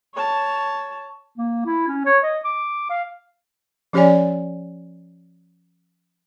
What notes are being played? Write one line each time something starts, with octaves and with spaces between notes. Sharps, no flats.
C#5 A5
A#3
E4
C#4
C#5
D#5
D6
F5
F3 C#4 G4 C#5 D5 G#5